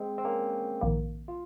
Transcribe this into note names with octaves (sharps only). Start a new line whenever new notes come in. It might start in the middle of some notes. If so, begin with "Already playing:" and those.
Already playing: G#3 C4
C4
A#3 C#4
A#1 G#2 D#3 A#3
F4